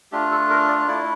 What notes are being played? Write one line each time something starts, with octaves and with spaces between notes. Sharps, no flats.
A3 D4 F4 G4
A4
A#4
D5
A3 E4 D5